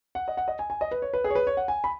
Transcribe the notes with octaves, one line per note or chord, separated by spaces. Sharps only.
F#5
D#5
F#5
D#5
G#5
G#5
D#5
B4
C#5
B4
G#4
C#5
B4
C#5
F#5
G#5
B5